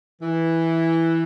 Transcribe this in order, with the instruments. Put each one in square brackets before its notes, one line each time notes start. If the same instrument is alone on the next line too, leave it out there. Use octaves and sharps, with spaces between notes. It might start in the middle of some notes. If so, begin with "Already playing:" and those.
[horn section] E3